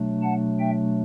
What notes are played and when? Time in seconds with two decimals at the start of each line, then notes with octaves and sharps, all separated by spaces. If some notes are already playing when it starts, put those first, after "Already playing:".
Already playing: B2 F#3 A3 D4
0.22 F#5 A5
0.59 E5 G5